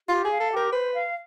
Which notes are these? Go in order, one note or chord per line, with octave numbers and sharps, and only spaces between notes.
F4 G4
G#4
F5
A4
G4
A#4
B4 C5
F5